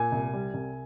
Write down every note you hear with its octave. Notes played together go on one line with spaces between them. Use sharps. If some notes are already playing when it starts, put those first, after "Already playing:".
Already playing: A#2 G#5
C2
G3
C2